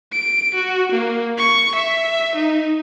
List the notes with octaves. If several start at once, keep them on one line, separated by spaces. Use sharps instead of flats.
D7
F#4
A#3
C#6
E5
D#4